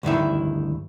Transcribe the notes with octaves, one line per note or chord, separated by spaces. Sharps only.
D2 G2 D#3 E4